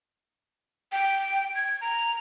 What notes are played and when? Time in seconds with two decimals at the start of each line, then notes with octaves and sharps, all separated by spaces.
0.92 G5
1.55 G#6
1.81 A#5